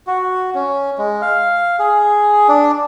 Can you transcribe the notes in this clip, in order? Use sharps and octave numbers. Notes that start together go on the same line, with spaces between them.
F#4
C#4
G#3
F5
G#4
D4